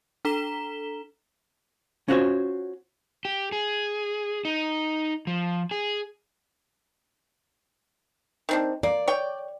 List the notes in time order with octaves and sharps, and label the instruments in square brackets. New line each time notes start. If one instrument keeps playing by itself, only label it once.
[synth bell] D4 A4 A#5 B6 E7 G7
[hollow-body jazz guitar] C#4 F4 F#4 A#4 C5 C#5
[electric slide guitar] G4
G#4
D#4
F3
G#4
[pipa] D#3 C4 D4
[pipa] A#3 [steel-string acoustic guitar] D5
[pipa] C#5 G5